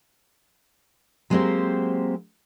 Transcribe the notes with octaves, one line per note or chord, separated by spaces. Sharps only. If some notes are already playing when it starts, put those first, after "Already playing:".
F#3 G#3 A#3 C4 G4 C5